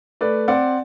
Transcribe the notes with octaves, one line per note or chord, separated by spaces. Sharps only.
A3 B4 D5
C4 D5 F#5